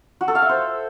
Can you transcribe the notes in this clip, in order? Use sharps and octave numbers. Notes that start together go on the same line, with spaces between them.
F#4
A4
F5
E5
C5